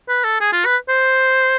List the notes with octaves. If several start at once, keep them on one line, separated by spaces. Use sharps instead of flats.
B4
A4
G#4
F4
B4
C5